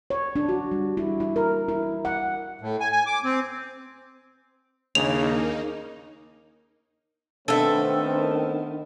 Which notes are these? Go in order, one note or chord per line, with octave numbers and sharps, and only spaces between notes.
C#5
D4
F#4
G3
E4
E4
A#4
E4
F#5
A2
G#5
G#5
D6
C4
D#2 C#3 A#3 D4 D#4 F7
D#3 A3 B3 C4 D4 A4 E5